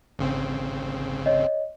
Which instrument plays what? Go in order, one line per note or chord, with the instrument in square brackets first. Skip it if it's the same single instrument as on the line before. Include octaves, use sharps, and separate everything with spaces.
[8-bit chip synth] G#1 C#3 C4
[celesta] C#5 D#5